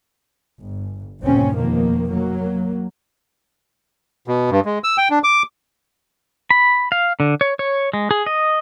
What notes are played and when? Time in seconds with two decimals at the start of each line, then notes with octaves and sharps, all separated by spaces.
0.61 G1
1.21 G1 D#2 A#2 C#3 C4 C#4
1.55 F1 B2 D#3 F3 A#3
2.08 F#3 A#3
4.28 B2
4.50 G2
4.65 G#3
4.84 E6
4.98 G5
5.10 D4
5.24 D6
6.51 B5
6.92 F5
7.20 D3
7.41 C#5
7.59 C#5
7.94 G#3
8.11 G#4
8.26 D#5